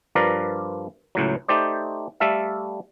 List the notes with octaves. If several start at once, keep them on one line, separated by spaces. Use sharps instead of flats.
G2 F3 A#4 B4 D5 A#5
C#2 A2 F#3
A3 D#4 G4 C5 D5
G3 A3 A4 E5 F5